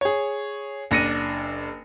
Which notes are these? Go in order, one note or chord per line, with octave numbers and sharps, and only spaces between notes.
G#4 C#5
F#1 D4 A#6 C#7 D#7